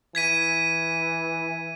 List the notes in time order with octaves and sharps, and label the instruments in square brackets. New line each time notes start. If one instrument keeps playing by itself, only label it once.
[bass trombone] E3 [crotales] G#6 B6 D#7